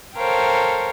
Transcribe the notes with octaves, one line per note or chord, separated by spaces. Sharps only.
A4 A#4 C5 C#5 F5 G5